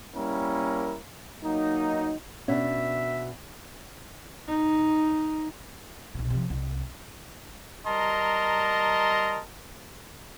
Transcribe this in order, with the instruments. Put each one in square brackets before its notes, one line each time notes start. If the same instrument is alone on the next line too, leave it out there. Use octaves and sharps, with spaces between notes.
[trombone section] G3 A#3 C#4 E4 A#4
F#3 A#3 D#4
[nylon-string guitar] B2 D4 [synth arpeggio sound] C#4 [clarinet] E5
[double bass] D#4
[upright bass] B1 C3
C3 F3
C2
[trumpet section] G3 A#4 D#5 A5 A#5 C6